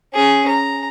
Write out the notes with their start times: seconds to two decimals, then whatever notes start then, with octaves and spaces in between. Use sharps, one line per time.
0.14 C#4 G#4
0.48 A#5